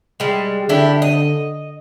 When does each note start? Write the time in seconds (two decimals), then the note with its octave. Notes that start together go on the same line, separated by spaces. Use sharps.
0.20 G3 G#3
0.69 D3 D4 E4 G4
1.02 D#5